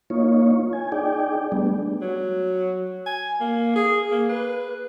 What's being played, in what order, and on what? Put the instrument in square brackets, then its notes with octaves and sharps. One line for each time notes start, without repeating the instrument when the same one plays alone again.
[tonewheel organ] A#3 D#4 F4 C#5
G#5
D#4 G#4 D5 G5
G3 A3 B3 D4
[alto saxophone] F#3
G#5
A#3
G#4
A#3
B4